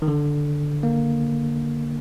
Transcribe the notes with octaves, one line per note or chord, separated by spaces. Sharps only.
D#3
D3
A#3